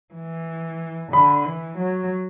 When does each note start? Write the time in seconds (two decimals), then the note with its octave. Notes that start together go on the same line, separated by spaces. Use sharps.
0.14 E3
1.13 D3 B5
1.45 E3
1.78 F#3